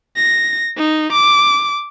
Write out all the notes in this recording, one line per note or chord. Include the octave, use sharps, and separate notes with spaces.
A#6
D#4
D6